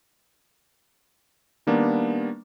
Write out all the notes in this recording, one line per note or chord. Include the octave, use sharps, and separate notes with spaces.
D#3 G3 A#3 B3 D4